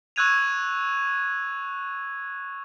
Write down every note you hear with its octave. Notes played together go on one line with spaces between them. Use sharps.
C#6 E6 F#6 G#6 D#7 F7